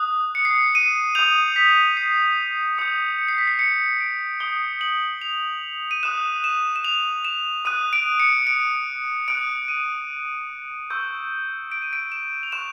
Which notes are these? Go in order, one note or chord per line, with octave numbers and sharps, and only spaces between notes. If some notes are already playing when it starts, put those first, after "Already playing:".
Already playing: D#6 F#6
C#7
C7
C#7
D#7
D#6 G6 F7
B6
C7
D#6 G6 C#7
C#7
C7
B6
C7
C#7
D7
D#6 G6 G7
F#7
F7
D#7
D#6 F#6 E7
E7
E7
F7
E7
D#6 F#6 D#7
D7
C#7
D7
D#6 F#6 D7
D#7
C#6 E6 G6
D7
D#7
D7
E7
F7
C#6 F#6 E7